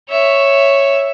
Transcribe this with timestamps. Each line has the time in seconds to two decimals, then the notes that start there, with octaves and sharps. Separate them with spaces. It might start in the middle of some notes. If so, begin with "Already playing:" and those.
0.10 C#5 E5